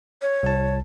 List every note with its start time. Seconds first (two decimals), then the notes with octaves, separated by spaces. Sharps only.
0.22 C#5
0.43 C2 A5